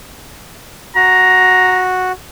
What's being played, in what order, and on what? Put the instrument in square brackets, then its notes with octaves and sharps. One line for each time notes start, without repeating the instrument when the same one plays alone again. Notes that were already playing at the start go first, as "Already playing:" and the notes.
[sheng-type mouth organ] F#4 [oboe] A#5